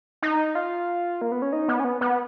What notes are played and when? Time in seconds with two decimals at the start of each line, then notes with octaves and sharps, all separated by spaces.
0.22 D#4
0.55 F4
1.22 A#3
1.32 B3
1.42 C#4
1.53 D#4
1.68 B3
1.80 C#4
1.84 B3
2.01 B3